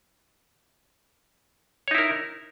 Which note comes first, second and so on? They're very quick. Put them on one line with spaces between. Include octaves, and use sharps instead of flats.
C#5 D#4 E4 A#4